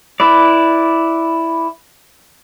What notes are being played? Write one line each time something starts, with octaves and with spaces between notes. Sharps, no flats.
E4 B4 D5